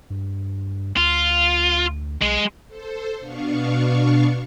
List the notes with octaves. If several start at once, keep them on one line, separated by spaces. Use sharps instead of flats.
G2
D2 F4
B1 G#3
A4 C5
B2 B3 D4 F5 C#6